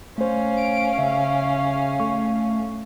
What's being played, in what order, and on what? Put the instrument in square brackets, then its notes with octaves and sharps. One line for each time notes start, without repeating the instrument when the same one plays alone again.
[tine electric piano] A3 C5 [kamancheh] C#4 F5
[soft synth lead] D7
[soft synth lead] C#3 [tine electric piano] E5
[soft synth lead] A3 [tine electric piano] C#6